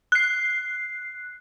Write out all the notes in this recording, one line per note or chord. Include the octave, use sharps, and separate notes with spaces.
F#6 C7